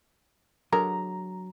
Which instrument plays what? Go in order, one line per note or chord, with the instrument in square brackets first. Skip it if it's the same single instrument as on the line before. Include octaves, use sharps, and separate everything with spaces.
[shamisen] D3 G#3 A#4 [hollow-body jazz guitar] F#3 [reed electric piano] A#5